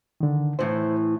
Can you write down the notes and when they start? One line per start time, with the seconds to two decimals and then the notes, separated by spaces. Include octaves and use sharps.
0.21 D3 D#3
0.59 A2 E3 C5